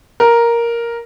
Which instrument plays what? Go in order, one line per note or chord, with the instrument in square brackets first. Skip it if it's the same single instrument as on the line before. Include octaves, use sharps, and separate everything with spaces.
[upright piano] A#4